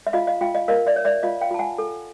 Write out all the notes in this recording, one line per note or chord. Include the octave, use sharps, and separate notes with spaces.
E5
F4 D#5 F5
D#5 F5
F4 F5 G5
D#5 F5
A#4 D#5 F5
D5 E5
C#5
D5 E5
F4 D#5 F5
F5 G5
F4 A5
F#5 G#5
A4